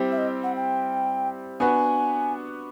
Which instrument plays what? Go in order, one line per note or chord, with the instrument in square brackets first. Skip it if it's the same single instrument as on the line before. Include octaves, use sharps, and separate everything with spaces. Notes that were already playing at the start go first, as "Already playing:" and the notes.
Already playing: [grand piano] G3 C4 E4 G4 C5
[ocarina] E5
D#5
F#5
G5
[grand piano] B3 D4 F#4 B4 [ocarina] G#5